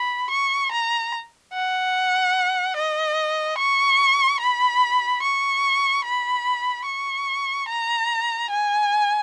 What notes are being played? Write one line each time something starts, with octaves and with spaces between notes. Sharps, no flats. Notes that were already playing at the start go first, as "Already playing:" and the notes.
Already playing: B5
C#6
A#5
F#5
D#5
C#6
B5
C#6
B5
C#6
A#5
G#5